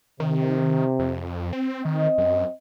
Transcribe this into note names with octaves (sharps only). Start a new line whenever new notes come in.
C3 D#3
F2
C4
D#3 C4 D#5
F#2